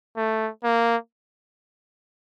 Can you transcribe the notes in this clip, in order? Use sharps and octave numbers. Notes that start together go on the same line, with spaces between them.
A3
A#3